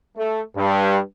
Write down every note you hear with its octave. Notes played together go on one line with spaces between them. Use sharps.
A3
G2